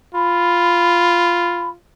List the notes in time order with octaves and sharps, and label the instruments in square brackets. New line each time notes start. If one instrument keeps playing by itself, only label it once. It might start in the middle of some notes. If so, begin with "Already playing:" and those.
[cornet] F4 [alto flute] B5